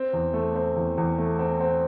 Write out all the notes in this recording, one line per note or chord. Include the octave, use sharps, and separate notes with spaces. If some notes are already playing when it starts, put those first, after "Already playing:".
Already playing: C4
E2
A3
C4
E2
E2
A3
C4
C4